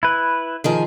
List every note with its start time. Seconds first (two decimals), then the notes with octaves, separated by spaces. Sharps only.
0.03 E4 B4
0.64 D#3 F3 G#4